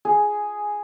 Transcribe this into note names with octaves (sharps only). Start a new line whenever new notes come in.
G#4